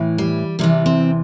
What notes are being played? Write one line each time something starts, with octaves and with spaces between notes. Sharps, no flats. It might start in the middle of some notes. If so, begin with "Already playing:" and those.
Already playing: A2 E3
G3
E2 C3 E3 G3
C4